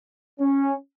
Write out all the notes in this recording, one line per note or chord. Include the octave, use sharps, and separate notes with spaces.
C#4